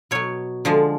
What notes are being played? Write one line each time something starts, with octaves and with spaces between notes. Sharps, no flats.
B2 F#3 C#5
D3 F3 G#3